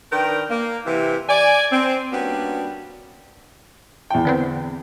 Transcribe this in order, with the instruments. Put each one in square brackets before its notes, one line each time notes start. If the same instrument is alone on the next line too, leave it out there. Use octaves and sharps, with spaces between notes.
[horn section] D#3 D4 A#4 B4 G5
A#3
C3 E3
D5 G#5
C4
G3 A#3 B3 C#4 D4 F#4
[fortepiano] E2 G5
[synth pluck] D3 B3 C4